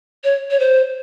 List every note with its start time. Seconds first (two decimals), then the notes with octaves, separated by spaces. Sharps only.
0.24 C#5
0.51 C#5
0.60 C5